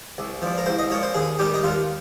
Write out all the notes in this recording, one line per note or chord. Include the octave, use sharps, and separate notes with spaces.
C2
A#2 F3
A#4
C2 C5
D#5
A#2 F3 C#5
C5
D#2 G#4
D#3 G3 G4
D#4
D#2 F4